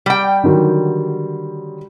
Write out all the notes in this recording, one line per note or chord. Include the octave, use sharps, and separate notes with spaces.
G3 G5
D3 D#3 F#3